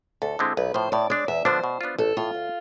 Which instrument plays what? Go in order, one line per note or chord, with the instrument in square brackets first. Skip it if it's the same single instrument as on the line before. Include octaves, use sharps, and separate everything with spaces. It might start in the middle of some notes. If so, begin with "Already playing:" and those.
[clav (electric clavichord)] D2 [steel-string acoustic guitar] A4
[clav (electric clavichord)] D3 G#3 C4 E4
[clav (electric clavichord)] B1 [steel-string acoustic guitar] B4
[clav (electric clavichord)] A2 F3 [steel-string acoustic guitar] C5
[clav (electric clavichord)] A2 [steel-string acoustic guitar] D5
[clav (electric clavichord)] G#3 D4 [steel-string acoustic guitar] D5
[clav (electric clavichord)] E2 [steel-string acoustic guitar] E5
[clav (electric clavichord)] D3 F3 B3 D4 [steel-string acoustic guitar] C5
[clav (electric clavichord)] B2
B3 D4 F4
[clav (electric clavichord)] A1 [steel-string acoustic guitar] A4
[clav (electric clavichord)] A2 E3 [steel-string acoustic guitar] F4
[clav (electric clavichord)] D2